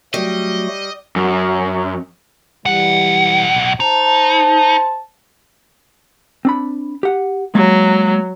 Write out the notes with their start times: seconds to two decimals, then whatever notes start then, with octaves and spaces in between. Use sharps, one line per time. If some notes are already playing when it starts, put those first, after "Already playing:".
0.14 F#3 G3 A3 F#4 D#5
1.16 F#2
2.66 B1 E3 G3 F#5
3.80 D#4 C5 A5
6.45 C4 D4 B5
7.03 G4 F#5
7.55 F#3 G#3 A#3